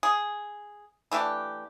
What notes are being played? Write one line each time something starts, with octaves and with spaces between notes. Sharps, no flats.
G#4
E3 A3 D4 G4